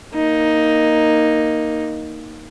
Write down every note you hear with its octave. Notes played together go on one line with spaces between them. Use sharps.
A#3 D#4